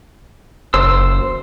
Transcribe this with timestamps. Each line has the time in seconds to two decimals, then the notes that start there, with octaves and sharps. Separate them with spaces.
0.74 F#1 C5 E6